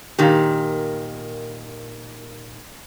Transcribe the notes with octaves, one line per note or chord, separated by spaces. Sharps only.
A#2 D#3 G4